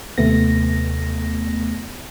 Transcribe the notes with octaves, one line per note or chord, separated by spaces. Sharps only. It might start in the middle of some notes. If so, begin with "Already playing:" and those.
D#2 C3 A3 B3 A#6